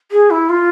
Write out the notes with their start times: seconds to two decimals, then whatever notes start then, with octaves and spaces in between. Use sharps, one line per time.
0.11 G#4
0.30 E4
0.49 F4